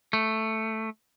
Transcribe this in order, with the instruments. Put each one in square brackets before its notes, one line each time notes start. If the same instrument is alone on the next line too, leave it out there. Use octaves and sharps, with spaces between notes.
[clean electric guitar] A3